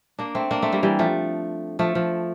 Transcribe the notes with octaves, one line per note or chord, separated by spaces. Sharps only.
A#3 D4
A3 C4
A#3 D4
A3 C4
G3 A#3
E3 G3
F3 A3
F3 A3
F3